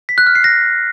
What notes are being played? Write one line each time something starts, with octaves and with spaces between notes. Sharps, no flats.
B6
F#6
F6
C7
A#6